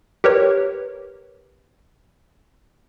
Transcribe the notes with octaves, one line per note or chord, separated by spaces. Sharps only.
G4 A#4 B4 C#5